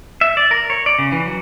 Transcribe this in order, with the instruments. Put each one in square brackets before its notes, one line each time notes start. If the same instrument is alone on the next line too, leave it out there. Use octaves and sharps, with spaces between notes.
[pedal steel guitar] E5
D5
A#4
C#5
D5
C#3
E3
F#3